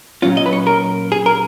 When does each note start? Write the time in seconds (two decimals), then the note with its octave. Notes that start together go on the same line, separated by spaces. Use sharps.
0.22 A#2 F#3 C#4 F4
0.37 D#5
0.46 B4
0.53 C#5
0.67 A#4
1.12 G#4
1.26 A#4